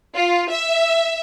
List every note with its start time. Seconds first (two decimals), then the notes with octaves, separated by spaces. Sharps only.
0.15 F4
0.49 E5